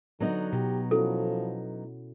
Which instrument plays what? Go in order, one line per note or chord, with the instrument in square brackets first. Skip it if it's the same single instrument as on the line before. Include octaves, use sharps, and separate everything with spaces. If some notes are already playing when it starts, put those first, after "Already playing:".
[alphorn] D3 [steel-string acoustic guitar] F#3 B3 D#4
[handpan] B2 [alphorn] G4
[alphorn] F3 [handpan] C#4 E4 F#4 [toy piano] A4